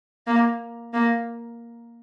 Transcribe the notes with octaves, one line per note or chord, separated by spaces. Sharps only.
A#3
A#3